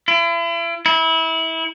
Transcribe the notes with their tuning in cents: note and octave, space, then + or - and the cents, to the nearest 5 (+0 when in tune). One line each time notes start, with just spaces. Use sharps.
E4 +40
E4 -25